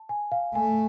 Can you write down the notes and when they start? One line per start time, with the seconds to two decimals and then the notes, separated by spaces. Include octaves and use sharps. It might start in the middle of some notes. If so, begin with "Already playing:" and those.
Already playing: A5
0.09 G#5
0.32 F5
0.55 A3 G#5